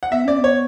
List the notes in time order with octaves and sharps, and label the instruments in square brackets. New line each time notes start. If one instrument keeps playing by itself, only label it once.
[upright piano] F#5
[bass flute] B3 [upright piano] E5
[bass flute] C#4 [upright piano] D5
[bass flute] B3
[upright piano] C#5